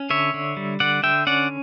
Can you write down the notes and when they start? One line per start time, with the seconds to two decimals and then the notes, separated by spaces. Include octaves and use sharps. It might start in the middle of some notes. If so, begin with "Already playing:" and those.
Already playing: C#4
0.10 D3 C#5 E5
0.34 D3
0.57 G3
0.80 D3 D5 F#5
1.03 D3 E5 G5
1.27 C#4 D5 F#5